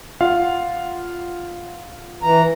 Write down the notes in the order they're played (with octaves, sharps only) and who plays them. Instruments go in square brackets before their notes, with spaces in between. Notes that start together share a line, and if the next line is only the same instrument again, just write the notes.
[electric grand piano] F4 F5 F#5
[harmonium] E3 A#5